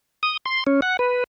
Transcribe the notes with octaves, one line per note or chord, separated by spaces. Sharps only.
D#6
C6
C#4
F#5
B4